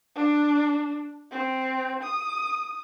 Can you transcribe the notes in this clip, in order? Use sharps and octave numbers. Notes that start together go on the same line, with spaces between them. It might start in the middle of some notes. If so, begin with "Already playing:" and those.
D4
C4
D#6